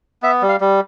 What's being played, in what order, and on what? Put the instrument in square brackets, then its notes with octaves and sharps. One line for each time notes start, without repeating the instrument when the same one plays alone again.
[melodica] B3 E5
G3
F5
G3